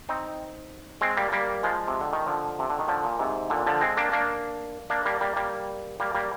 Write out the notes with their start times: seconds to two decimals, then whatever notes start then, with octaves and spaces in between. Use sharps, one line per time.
0.09 C4 D#4
1.01 G#3 C4
1.17 G3 A#3
1.32 G3 A#3
1.63 F3 G#3
1.87 C3
2.01 D3
2.13 D#3
2.26 D3 F3
2.59 C3
2.70 D3
2.79 D#3
2.88 D3 F3
3.04 A#2
3.19 G#2 C3
3.50 A#2 D3
3.67 D3 F3
3.81 G#3 C4
3.97 A#3 D4
4.12 A#3 D4
4.90 A#3 D4
5.05 G3 A#3
5.21 G3 A#3
5.36 G3 A#3
6.00 G3 A#3
6.15 G3 A#3